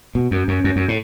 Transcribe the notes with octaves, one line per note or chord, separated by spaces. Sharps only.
B2
F#2
F#2
F#2
F#2
A2